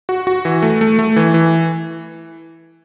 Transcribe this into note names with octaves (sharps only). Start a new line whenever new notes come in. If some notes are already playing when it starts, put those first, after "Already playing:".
F#4
F#4
E3
A3
A3
A3
E3
E3